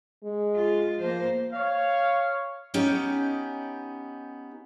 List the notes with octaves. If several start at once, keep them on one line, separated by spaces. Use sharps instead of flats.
G#3
F4
F3 A#3 C5
C#5 F5
B3 C#4 D#4 G4 D#5